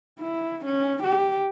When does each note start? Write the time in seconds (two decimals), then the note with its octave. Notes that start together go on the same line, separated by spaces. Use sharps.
0.20 E4
0.66 C#4
1.03 G4